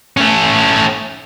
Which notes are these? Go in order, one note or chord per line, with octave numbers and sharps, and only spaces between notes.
A3 C#4